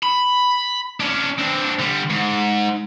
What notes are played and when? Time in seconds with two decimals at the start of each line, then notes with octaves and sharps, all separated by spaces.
0.03 B5
1.00 C#4 D4
1.38 C4 D4
1.79 D3 G3
2.10 G#2